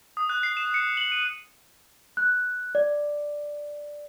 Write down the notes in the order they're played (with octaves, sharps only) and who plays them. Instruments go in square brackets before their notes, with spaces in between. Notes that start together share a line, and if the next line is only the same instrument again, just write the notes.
[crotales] D#6
F#6
C7
E7
C#7
F#7
D#7
[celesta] F#6
D5